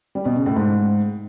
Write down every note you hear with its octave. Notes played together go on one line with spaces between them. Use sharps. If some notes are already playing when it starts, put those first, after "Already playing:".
G3
B2
C#3
A2
G#2